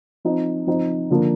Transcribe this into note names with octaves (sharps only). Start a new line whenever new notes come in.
F3 C4 D#4
F3 C4 D#4
D3 F3 A#3 D4